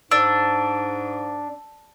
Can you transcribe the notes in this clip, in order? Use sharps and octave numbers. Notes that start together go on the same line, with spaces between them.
G#2 D4 E6